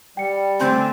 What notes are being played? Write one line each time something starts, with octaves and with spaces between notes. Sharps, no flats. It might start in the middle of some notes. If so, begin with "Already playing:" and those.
G3 G5 C#7
D3 A3 C4 G#5 C6 G6